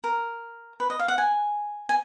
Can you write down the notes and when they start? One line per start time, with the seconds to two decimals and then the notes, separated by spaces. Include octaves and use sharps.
0.04 A#4
0.80 B4
0.90 D#5
0.99 F5
1.08 F#5
1.18 G#5
1.89 G#5